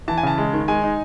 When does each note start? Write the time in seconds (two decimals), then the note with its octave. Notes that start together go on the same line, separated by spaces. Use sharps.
0.08 E3 A5
0.18 G#5
0.23 C#3 A5
0.38 G#3
0.53 D#3
0.68 G#3 G#5
0.83 D#4